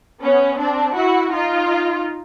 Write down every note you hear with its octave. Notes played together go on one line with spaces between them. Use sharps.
B3 C#4
C4 D4
E4 F#4
D#4 F4